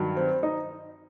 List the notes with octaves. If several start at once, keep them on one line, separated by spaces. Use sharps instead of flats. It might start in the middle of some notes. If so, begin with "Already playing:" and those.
Already playing: G2 D#3 F#3
C4
D#4